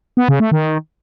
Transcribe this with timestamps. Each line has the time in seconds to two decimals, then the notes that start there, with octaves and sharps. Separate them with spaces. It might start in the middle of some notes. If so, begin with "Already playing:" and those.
0.17 B3
0.28 C#3
0.40 A3
0.52 D#3